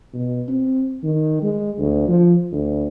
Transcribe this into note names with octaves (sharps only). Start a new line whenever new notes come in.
B2
C4
D#3
G#3
D2
F3
D2